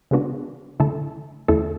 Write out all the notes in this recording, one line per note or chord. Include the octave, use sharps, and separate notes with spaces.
C#3 G#3 B3 D4 F#4
D3 A3 E4 A4
E2 D3 A3 E4 A4